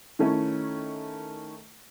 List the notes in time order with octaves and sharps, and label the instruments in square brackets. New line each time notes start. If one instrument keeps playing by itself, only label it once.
[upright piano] D#3 A3 C#4 E4